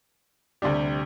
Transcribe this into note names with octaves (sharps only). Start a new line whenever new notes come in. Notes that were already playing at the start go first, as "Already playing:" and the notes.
D2 C3 G3 D4 G4